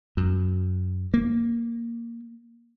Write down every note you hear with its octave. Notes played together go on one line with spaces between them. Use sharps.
F#2
A#3